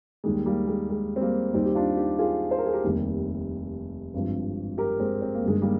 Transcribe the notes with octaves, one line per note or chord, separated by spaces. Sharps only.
D#2 D#3 G3 G#3
G3 A#3
G#3
G#3
C4
G3 A#3
D#2 D#3 G3 C4 D#4
G4
D4 F4
D#4 G4
F4 G#4
C5
A#4
G#4
G4 A#4
F1 D#2 D#3 G3
G#1 G2 F3
G4 A#4
G#3 C4
C4
A#3
G1 G2 D#3 G#3
G3 A#3